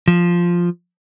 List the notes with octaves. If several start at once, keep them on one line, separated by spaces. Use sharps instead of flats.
F3